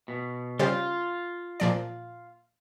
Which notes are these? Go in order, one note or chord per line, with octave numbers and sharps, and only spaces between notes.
B2
C#3 G3 F4 C5
A#2 F3 D5